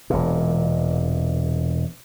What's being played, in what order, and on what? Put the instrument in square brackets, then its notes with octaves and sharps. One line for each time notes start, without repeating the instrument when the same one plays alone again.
[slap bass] E1 A#2